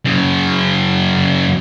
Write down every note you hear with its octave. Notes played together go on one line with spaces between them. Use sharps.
F#2 C#3